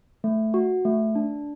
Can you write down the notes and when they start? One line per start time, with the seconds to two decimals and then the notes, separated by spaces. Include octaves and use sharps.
0.24 A3
0.54 F#4
0.85 A3
1.15 D4